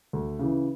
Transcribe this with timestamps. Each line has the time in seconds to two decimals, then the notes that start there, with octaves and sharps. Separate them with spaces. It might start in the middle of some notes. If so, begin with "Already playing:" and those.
0.13 D2
0.39 C#3 E3